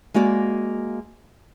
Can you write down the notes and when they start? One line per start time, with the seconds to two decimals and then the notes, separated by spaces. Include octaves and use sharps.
0.14 G#3 A#3 F#4 D5